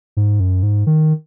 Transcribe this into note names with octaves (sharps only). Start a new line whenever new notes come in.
G#2
F#2
G#2
D#3